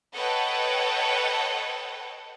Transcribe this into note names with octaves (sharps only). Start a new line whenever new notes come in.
A4 B4 C#5 D#5 F#5 G5